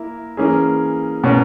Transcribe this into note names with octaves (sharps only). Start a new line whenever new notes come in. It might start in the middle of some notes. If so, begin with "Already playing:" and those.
Already playing: A#3 E4 A#4
E3 A#3 C#4 G#4
B2 A#3 C#4